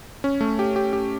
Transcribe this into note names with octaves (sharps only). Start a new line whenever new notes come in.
C#4
A3
G4
G4
G4